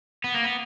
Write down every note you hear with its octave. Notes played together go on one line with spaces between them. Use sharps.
B3
A#3
B3